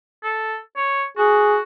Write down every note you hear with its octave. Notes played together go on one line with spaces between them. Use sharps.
A4
C#5
F#4 G#4